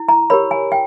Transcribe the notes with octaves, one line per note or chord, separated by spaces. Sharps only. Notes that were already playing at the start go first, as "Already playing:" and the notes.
Already playing: E4
A#5
G4 A#4 C#5 B5
G#5
G5